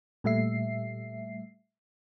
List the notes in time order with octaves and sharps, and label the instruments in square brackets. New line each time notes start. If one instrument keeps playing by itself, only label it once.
[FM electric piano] A#2 G3 A3 E5 C7